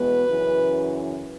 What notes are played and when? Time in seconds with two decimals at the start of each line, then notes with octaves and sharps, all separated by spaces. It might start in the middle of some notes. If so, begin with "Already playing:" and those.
Already playing: E2 B2 G#3 B3 B4
0.27 F#2 C#3 E3